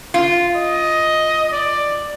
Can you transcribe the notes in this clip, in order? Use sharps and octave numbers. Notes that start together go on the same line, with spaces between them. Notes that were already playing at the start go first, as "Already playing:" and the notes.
F4
D#5
D5